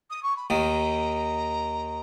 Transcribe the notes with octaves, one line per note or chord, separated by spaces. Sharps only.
D#6
C#6
B5
D#2 D#3 A#5